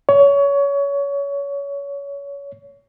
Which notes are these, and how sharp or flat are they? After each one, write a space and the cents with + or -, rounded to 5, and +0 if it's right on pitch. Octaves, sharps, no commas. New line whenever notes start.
C#5 +25